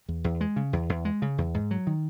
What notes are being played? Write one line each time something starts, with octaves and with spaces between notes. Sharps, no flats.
E2
E2
G#3
C#3
E2
E2
G#3
C#3
E2
G#2
F#3
D#3